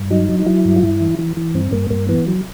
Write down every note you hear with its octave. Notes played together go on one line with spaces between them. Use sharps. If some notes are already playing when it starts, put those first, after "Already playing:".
Already playing: G2
F#3 D#4
F#3
D#4
F#3 E4
G2
F4
G2 E4
E3
E3
E3
G2 C4
G2 A#3
G2 A#3
E3 B3
F#3